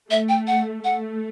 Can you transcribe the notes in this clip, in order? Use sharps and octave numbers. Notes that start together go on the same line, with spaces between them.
A3 E5
G5
F#5
A3 F#5